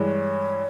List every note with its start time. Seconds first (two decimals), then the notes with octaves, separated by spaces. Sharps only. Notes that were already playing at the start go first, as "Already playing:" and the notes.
Already playing: G2 E3 G#3 C#5